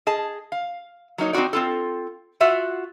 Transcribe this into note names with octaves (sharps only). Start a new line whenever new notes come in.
G#4 D#5 A5
F5
F#3 A#3 D#4 C#5
C4 D#4 E4 F#4 D5
C4 F4 A4
F4 F#4 E5 F#5